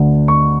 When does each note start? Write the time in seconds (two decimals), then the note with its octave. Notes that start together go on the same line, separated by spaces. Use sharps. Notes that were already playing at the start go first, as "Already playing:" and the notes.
Already playing: D2 D3
0.28 C#6